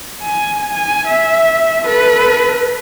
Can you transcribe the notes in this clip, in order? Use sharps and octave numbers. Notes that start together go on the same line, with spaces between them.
G#5
G#5
E5
A4 B4